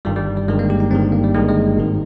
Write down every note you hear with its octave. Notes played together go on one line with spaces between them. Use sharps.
G1 G2 D#3 G3
G3
G3
G1 G2 D#3 G#3
A#3
G4
D#4
G1 G2 D#3 C4
A#3
G3
G1 G2 D#3 G#3
G#3
G#1 G#2 D#3